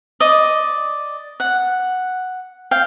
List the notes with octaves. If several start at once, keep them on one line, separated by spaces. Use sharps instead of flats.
D5 D#5
F#5
F5 G5